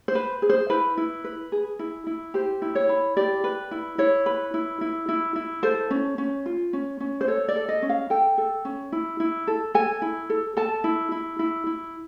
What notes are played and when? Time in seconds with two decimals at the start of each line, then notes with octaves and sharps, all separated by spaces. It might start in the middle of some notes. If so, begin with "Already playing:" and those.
0.08 C5
0.15 B4
0.42 G#4
0.50 C5
0.70 E4 B4
0.97 E4
1.24 B4
1.52 G#4
1.79 E4
2.07 E4
2.34 G4 C5
2.62 E4
2.75 C#5
2.89 E4
3.17 G4 D5
3.44 B4
3.71 E4
3.98 E4 C#5
4.26 B4
4.54 E4
4.81 E4
5.09 E4
5.36 E4
5.63 A4 C5
5.91 C#4
6.18 C#4
6.46 F4
6.73 C#4
7.00 C#4
7.21 C5
7.27 A4 C#5
7.48 D5
7.56 A4
7.69 D#5
7.82 C#4
7.89 F5
8.10 A4 G5
8.38 A4
8.65 C#4
8.92 E4
9.20 E4
9.47 A4
9.74 A4 G#5
10.02 E4
10.30 A4
10.57 A4 A5
10.84 E4
11.12 E4
11.39 E4
11.67 E4